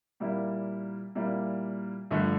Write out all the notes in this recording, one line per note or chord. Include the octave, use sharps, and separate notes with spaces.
A#2 G3 A#3 E4
A#2 G3 A#3 E4
G2 D3 F3 A3